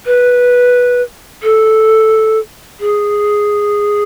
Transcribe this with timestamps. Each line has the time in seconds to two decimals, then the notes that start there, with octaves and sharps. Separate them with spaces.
0.06 B4
1.43 A4
2.80 G#4